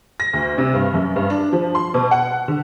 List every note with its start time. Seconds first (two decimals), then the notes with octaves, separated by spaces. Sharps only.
0.20 A#6
0.33 D2
0.58 C3
0.74 G2
0.94 F#2
1.16 G2
1.30 D4
1.53 F3
1.75 C6
1.94 B2
2.11 F#5
2.48 D3